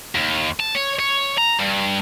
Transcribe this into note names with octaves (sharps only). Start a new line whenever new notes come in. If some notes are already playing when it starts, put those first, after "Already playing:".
D#2
A5
C#5
C#5
A#5
G2